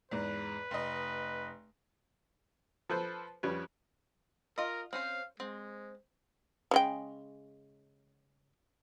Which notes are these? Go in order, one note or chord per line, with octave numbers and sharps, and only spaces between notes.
E2 G#2 B4
F1 D#5
F3 A4 B4 C5
F2 G3 C#4 B4
F4 A#4 D#5
C4 C#4 C5 F5
G#3 C4
C#3 G#3 G5